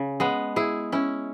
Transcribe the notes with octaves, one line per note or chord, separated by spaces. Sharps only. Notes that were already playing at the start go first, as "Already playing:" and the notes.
Already playing: C#3
G#3 B3
E4 G#4
C#4 E4